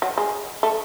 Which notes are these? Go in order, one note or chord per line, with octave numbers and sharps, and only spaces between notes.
F#3
G#3
A3